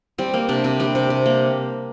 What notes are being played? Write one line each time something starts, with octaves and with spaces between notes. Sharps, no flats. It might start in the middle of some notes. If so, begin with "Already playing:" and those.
G3 C4
A#3 C4
C3 D4
C3 C4
G3 D4
C3
C3
A#3